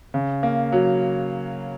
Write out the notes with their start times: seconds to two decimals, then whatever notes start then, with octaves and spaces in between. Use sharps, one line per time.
0.14 C#3
0.43 A#3
0.72 F#3